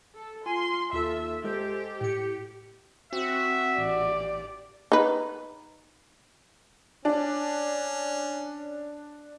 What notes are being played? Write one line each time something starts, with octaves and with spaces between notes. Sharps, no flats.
A4
F4 G#5 C6
D#2 F4 A4 E5
G#3 G4 A4 C5
A2 C#7
C4 F#4 E5
A1 G4 D5
D#4 B4
C#4 D4